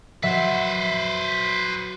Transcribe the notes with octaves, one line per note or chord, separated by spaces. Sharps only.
F#3 B4 C5 E5